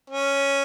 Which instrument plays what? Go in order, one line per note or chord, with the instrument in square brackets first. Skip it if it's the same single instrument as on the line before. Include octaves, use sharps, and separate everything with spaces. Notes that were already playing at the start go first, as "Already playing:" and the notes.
[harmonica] C#4